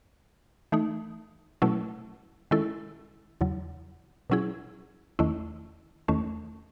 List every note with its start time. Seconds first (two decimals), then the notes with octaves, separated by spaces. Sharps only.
0.72 E3 A3 D#4
1.62 B2 F#3 A3 C#4 E4
2.51 D#3 G#3 C#4 E4 A4
3.41 E2 C#3 F#3
4.30 B2 F#3 C#4 E4 G#4
5.19 E2 D#3 A3 C#4 E4
6.08 E2 D#3 A3 C#4